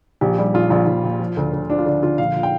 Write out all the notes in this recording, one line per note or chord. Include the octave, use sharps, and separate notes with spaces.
A#1 G4
G3
A#1 F4
A#1 F4
A#1
A#2
F3
D2
D2
F3 D4
F4
D3 D4
D3 F4
A#1 F5
A#2
G5